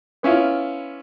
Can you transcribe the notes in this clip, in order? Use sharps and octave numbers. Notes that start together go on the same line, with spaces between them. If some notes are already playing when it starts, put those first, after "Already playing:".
B3 C#4 E4 F4